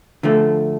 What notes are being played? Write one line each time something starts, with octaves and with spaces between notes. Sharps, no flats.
D3 F3 A3